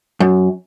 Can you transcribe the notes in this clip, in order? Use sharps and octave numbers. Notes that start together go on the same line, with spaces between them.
F#2